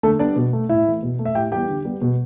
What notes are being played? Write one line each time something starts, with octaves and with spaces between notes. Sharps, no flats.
D3 A3 A4
G3 B3 D4 D5
B2
A3
A2 E4 E5
E3 A3
B2
A3
E5
A2 G4 G5
E3 G3 B3 G4 G5
D3
G3 B3
B2